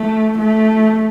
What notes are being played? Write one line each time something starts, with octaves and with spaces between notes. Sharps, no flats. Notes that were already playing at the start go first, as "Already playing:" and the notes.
Already playing: A3
A3